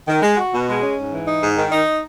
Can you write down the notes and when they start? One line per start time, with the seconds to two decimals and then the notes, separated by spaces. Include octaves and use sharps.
0.08 D#3
0.22 G#3
0.38 F#4
0.52 B2
0.68 G#3
0.83 C#4
0.97 G#2
1.13 E3
1.28 D#4
1.42 G#2
1.57 D#3
1.72 D#4